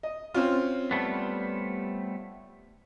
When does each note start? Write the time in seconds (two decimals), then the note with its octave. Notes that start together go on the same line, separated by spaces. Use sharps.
0.03 D#5
0.34 C4 C#4 F4
0.91 G3 A3 B3